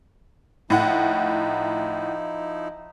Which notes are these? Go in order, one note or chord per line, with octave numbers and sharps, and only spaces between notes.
A2 F3 D#4 E4 F#5